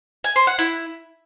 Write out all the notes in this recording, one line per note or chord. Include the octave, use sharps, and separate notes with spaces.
G#5
C5
F#5
E4